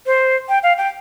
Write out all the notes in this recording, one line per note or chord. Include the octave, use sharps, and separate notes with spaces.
C5
G5
F5
G5